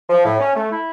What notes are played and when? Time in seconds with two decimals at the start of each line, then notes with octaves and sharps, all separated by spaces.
0.10 F3
0.25 A2
0.40 C#4
0.55 A3
0.71 E4